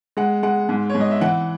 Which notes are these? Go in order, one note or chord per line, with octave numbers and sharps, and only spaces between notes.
G#3 F#5
G#3 F#5
G#2
C#5
G#2
D#5
E5
E3 F#5